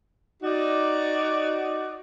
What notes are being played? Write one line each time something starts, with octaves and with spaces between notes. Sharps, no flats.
D#4 F#4 D5